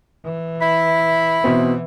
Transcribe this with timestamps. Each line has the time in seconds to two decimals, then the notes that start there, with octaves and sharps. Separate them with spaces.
0.25 E3
0.62 E4 B5
1.44 B2 E3 C4